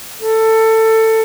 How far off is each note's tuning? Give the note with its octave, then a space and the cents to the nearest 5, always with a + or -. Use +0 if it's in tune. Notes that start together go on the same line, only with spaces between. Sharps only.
A4 +15